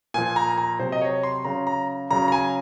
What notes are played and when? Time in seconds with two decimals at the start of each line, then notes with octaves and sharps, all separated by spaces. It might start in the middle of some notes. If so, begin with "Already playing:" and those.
0.14 A#2 F3 G#5
0.36 A#5
0.58 A#5
0.79 C3 F#3 C5
0.92 D#5
1.01 C#5
1.23 C6
1.44 C#3 F#3 A#5
1.67 A#5
2.11 C#3 F#3 A#5
2.28 A#5
2.32 G#5